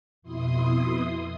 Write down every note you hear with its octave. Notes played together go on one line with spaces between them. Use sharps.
F2 B2 E4 C6 D#6